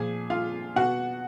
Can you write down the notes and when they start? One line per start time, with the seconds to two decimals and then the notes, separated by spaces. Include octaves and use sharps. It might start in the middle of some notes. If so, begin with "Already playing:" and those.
Already playing: A#2 F3 G#4 G#5
0.30 F4 F5
0.76 B2 F#4 F#5